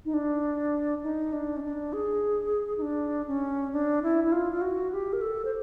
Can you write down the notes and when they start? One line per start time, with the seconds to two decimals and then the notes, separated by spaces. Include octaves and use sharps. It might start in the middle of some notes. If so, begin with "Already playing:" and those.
0.05 D#4
0.14 D4
1.03 D#4
1.33 D4
1.56 C#4
1.63 D4
1.93 G#4
2.78 D#4
2.82 D4
3.27 C#4
3.73 D4
4.03 E4
4.24 E4
4.32 F4
4.52 F4
4.61 F#4
4.92 G4
5.13 A#4
5.21 A4
5.45 C5